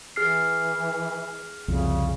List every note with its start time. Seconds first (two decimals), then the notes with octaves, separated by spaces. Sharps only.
0.16 E3 G#4 F6 C7
1.68 C2 F2 C#3